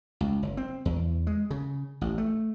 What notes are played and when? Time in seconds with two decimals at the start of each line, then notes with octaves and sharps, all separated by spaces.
0.21 C#2
0.43 F#1
0.57 C4
0.85 E2
1.27 G#3
1.51 C#3
2.01 A1
2.18 A3